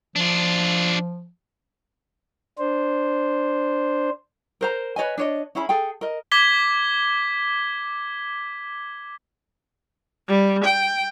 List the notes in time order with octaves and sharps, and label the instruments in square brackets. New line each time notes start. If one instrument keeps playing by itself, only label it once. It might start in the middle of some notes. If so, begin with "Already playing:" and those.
[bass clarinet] F3 [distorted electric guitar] D4 F4
[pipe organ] D4 C5
[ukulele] A#4 C5 A#5
B4 C#5 D#5 G#5
D4 C#5 D#5
C#4 E4 G#4 B5
G#4 A4 G5
A#4 D#5
[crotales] D6 G#6 B6 G7
[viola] G3
G5